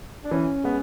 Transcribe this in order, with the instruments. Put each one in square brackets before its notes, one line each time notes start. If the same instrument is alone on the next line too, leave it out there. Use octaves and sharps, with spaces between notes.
[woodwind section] D4
[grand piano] E3 [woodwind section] C#4
[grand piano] G#3 B3